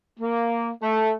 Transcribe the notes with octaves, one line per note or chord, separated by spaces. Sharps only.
A#3
A3